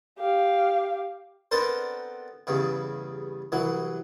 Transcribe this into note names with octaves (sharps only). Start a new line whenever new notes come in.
G4 F5
B3 C4 D4 A4 A#4 C5
E2 G2 C#3
C2 E3 F#3